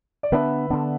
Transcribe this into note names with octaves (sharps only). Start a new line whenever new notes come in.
D5
D3 B3 D4 B4 E5
D3 B3 D4